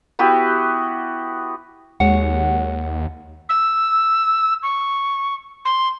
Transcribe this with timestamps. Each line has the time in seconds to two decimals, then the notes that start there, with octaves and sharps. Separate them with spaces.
0.19 B3 E4 F#4 G4
2.00 D#2 G#3 F#4 C#5 F#5
3.49 E6
4.63 C#6
5.65 C6